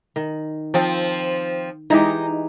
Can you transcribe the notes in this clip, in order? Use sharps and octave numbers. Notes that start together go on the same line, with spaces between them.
D#3
F3 C4
E3 G#3 D#4 G4